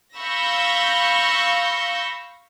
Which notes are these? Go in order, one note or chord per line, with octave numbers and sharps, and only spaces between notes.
F5 B5 C#6 E6 G6 A#6